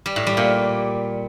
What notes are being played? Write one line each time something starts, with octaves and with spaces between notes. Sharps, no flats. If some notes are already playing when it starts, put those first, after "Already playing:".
G3
A2
G3
A#2